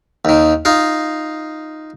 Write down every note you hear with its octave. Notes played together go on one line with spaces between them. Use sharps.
D#2 D#3
D#4 F4 F5